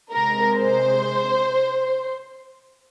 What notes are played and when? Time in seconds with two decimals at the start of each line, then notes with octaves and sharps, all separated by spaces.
0.13 C3 G#3 A#4
0.56 C5